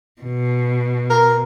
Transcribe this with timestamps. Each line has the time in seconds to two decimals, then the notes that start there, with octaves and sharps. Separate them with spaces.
0.22 B2
1.10 A#4